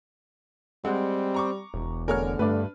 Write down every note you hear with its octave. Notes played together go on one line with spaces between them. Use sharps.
G3 G#3 C4 F#5
A#5 C#6 D6
E1
D3 A3 B3 G#4 A#4 C#5 F6
G2 A3 D4 B4 D5